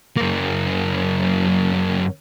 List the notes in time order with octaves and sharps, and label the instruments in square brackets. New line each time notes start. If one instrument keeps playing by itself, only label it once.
[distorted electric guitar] F#2 A#3